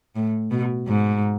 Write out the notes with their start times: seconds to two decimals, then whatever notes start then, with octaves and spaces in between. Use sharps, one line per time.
0.16 A2
0.51 B2
0.88 G#2